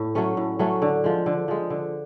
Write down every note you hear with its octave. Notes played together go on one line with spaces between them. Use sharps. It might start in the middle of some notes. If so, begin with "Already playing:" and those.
Already playing: A2
F#3 A3 C#4
A2
F#3 A3 C#4
D3
F3 G#3
D3
F3 G#3
D3